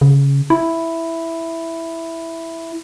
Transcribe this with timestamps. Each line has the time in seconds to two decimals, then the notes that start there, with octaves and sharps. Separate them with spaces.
0.01 C#3
0.50 E4